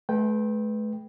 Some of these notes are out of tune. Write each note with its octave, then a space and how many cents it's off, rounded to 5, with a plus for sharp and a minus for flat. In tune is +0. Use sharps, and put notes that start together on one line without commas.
A3 -45 B4 +0 G5 +0